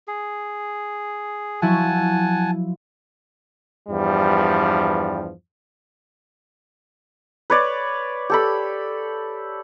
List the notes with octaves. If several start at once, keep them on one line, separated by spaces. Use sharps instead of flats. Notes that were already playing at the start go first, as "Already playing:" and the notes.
G#4
F3 F#3 E4 F#5 G#5 A5
E2 G2 F3 G3
B4 C#5 D5
G4 A4 B5